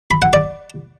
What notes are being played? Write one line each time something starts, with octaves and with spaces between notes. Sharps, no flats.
B5
F#5
D5